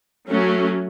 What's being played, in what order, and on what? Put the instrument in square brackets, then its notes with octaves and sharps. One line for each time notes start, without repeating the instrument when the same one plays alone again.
[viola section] F#3 A3 C#4